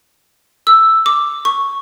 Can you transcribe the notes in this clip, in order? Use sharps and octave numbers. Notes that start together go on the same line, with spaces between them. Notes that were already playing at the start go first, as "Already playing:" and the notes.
E6
D6
C#6